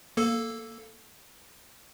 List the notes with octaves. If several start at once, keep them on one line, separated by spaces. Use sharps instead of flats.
A#3 A4